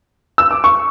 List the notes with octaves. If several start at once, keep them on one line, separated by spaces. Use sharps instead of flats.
E6
D6
C#6